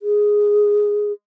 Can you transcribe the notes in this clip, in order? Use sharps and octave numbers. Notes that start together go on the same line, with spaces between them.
G#4